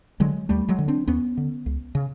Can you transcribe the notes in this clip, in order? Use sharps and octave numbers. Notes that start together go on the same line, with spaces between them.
D3 F#3 G#3
D#2 G3 A3
F#3 G#3
D3
C4 D4
D#2 B3 C#4
D3
C#2
C#3